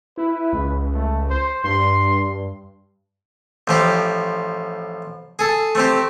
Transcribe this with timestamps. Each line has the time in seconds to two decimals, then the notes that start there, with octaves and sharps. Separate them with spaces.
0.17 E4 B4
0.53 C#2
0.94 A3
1.30 C5
1.64 G2 C6
3.67 A1 F3 G4
5.39 G#4 A4
5.75 A3 C4 G4